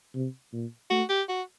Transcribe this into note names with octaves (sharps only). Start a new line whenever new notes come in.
C3
A#2
A3 F#4
G4
F#4